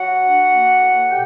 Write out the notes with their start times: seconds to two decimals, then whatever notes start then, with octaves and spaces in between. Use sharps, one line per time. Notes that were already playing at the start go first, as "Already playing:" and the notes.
Already playing: F#3 F#4 F#5
0.21 D4
0.51 A#3
0.80 A2
1.10 B2 G4 G5